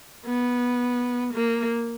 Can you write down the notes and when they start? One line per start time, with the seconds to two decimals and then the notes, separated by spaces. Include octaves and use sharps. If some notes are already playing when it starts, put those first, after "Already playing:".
0.26 B3
1.34 A#3